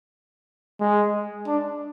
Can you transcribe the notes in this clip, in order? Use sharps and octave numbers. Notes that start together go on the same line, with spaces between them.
G#3
D4